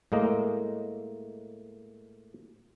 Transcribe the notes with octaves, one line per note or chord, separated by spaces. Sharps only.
A2 G#3 A#3 D#5